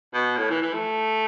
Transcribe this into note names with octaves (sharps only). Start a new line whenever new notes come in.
B2
A2
E3
E3
A3